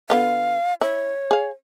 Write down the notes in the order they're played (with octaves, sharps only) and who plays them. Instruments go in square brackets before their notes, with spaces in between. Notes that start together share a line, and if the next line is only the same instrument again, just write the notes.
[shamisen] D3 B3 F4 [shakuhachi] F5
[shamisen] E4 [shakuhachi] C#5
[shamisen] G#4 F5